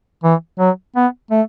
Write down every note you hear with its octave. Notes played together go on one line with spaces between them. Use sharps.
E3
F#3
B3
A3